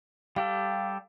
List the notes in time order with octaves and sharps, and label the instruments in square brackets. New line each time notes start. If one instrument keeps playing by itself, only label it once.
[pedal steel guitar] G3 G4 A4 [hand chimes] F5